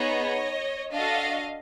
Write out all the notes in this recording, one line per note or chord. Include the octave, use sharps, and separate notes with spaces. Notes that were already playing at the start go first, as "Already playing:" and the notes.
Already playing: B3 D#4 G#4 C#5 D#5
D4 F#4 A4 D#5 F5